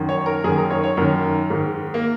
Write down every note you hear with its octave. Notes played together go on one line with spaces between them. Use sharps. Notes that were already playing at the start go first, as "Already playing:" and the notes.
Already playing: F#2 D#3
C#5
A#4
F#2 D#3 G#4
A#4
C#5
C#5
F#2 D#3 A#4
G#2 D#3
A#3